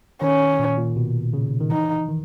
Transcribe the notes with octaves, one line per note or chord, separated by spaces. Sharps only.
D#3 C#4
A#2
A#2
B2
C#3
D#3
E3 D#4
D#3